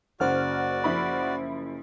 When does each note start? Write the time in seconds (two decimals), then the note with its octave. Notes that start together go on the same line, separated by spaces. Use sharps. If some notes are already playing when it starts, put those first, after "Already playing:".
0.20 F#1 F#4 C5 D5 F#5 F6
0.84 F3 E4 B5